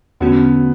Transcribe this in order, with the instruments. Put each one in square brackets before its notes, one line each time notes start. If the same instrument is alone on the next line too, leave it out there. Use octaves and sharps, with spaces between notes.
[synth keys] E2 D3 A3 C#4 F#4 [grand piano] B3